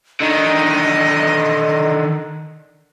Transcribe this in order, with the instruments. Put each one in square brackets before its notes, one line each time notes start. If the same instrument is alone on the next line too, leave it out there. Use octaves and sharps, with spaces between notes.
[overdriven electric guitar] D3 D#3 [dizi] D#5